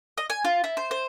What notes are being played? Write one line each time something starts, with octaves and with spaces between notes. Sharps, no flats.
D#5
G#5
F4
E4
C5
C5